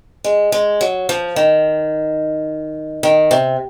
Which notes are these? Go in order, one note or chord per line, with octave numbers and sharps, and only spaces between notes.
G#3
G#3
F#3
F3
D#3
D#3
C3